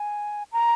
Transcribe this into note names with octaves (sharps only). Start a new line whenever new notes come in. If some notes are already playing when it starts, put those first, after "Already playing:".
Already playing: G#5
A#5